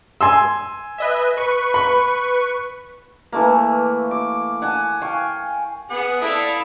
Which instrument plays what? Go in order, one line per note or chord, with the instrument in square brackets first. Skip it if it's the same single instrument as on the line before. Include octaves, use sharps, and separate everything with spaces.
[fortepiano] G#5 C6 E6
[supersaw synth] B4 D#5 E5
B4 C#6
[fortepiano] B5
[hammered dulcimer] E3 A3 A#3
D6
F#5 G#5 A5
F5 G5 G#5 C#6
[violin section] B3 [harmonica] G#4 F#5
[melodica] E4 [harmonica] A4 D#6 [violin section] D5 E5 F5